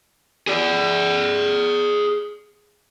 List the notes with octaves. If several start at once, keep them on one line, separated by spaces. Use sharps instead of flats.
G#4 D5